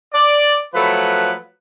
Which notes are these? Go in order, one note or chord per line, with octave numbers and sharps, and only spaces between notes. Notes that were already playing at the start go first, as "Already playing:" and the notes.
D5
F3 F#3 A3 B4